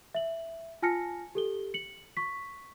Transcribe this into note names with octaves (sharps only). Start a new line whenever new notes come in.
E5 F#7
F4 G#5 A5 F6 A#6 C#7
G4 A4 G7
C#7 F#7
C#6 B6